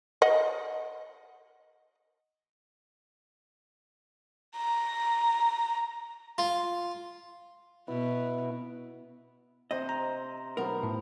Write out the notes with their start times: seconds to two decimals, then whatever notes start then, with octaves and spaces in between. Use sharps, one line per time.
0.22 D#5 F#5
4.56 A#5
6.38 F4
7.88 B2 B3 E4
9.71 C3 C5 D#5
9.89 A#5
10.57 B1 B3 A#4 C5
10.83 A2